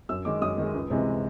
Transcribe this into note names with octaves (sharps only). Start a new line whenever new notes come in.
F#2 E6
D#3 G#3 D6
F#2 D#6
D#3 G#3
C#2
C3 E3 G#3